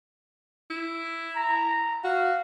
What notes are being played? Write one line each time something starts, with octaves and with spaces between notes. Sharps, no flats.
E4
A#5
F#4 F5